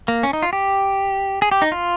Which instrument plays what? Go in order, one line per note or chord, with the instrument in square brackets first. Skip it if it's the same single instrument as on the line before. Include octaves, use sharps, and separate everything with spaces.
[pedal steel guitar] A#3
C#4
D#4
F4
G4
G#4
G4
D#4
F4